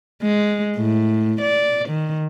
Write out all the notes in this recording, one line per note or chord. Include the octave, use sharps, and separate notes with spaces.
G#3
A2
D5
D#3